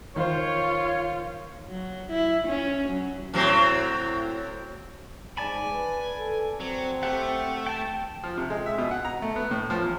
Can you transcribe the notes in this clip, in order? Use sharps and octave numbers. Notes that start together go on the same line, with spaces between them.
D#3 F4 C5 C#5
F#3
E4
C#4
F#3
A2 F#3 C4
G#2 D5 G#5 A5 B5
B4
A4
F#3 C4
A3 G4 F#5
G5 A5
F3
C3
G#3
E5
B2
F#5
A#5
A3
B3
A2
F3
E2